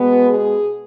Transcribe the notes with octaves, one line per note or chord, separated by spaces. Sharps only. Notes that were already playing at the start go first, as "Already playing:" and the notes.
Already playing: B2 G#3 B3
G#4